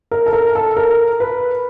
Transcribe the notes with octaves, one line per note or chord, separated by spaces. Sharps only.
A#4
A4
A#4
A4
A#4
B4